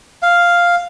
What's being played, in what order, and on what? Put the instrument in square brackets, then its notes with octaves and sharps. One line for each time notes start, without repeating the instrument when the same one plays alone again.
[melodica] F5